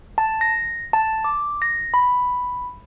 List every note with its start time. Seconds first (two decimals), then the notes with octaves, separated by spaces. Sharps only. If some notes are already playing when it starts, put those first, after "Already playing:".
0.18 A5
0.41 A#6
0.93 A5
1.24 D6
1.62 A#6
1.94 B5